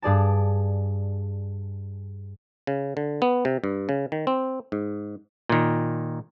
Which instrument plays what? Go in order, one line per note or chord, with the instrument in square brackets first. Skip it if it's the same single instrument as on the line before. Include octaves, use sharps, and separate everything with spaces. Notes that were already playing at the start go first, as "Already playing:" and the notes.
[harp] G2 G#4 D5 A5
[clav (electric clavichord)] C#3
D3
B3
C3
G2
C#3
D#3
C4
G#2
A#2 D#3